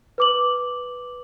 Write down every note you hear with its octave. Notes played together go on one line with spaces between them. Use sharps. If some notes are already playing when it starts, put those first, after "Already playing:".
B4 D6 F#7